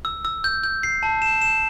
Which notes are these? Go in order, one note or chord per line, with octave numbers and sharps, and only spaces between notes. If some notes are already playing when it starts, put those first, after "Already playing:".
E6
E6
G6
G6
C7
A5
E7
E7